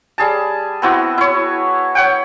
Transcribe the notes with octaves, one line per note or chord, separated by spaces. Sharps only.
G3 G#4 A5
B3 C4 E4 F#4
E4 C#5
C#5 F#5 G5